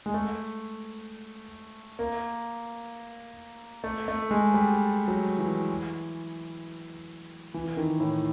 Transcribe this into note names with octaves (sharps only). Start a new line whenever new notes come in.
G#3
A3
A#3
A3
A3
G#3
G3
F#3
E3
E3
D#3
A2